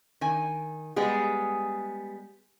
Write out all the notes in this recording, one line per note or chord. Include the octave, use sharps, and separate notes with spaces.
D#3 G#5
G3 G#3 B3 G#4